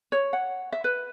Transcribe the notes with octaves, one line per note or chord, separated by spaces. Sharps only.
C#5
F#5
E5
B4